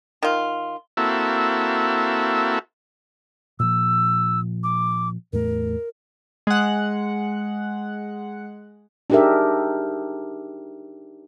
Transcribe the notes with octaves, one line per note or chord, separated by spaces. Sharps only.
D#3 F4
A#3 C4 E4 F#4 A4 E5
A#2 F3 E6
D6
E2 A2 A3 A#4
G#3 F#5
D4 D#4 G4 G#4 A#4 E5